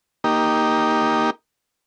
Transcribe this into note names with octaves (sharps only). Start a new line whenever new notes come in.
A#3 D#4 G4